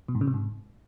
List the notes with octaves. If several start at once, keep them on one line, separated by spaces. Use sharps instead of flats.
B2
G#2
C#3
C3
G#2